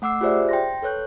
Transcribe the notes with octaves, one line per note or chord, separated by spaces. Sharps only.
A3 F#5 D6 E6 C7
F4 G4 G#4 C5 D5 E5
G5 C6 A#6
A4 B4 C#5 F#6 G6